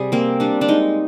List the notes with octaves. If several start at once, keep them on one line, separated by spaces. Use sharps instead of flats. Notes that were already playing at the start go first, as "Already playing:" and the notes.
Already playing: C3 G3 G#4
A#3 C4
G3 D4
D4
G#3 D#4